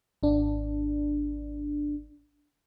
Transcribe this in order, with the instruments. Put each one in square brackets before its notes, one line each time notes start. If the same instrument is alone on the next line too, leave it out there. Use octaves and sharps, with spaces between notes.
[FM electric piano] G#1 D4